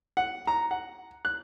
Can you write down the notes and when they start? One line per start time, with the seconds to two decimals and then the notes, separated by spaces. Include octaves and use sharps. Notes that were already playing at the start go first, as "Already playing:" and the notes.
0.17 F#5
0.47 A#5
0.71 F#5
1.25 F#6